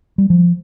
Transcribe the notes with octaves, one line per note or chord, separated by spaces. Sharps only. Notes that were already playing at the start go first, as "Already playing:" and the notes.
G3
F3